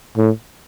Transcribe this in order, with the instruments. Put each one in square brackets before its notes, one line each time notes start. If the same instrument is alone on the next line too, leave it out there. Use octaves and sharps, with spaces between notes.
[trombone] A2